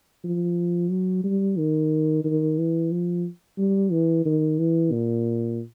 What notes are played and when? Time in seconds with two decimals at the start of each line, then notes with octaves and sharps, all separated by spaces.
0.24 F3
0.90 F#3
1.24 G3
1.58 D#3
2.24 D#3
2.58 E3
2.92 F3
3.58 G3
3.92 E3
4.25 D#3
4.59 E3
4.92 A#2